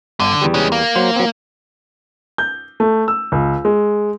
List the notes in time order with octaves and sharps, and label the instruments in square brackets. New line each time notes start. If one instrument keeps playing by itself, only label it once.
[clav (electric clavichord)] G1 [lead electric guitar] D3
[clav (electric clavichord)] E2 G3
[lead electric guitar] G#3 C#4
A#3
[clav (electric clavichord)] F#3 C5
F#3 C4
[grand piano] G6
A3
E6
C#2
G#3